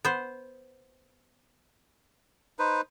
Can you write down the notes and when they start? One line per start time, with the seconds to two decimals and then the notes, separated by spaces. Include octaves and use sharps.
0.05 B3 C5
2.59 D#4 B4 C5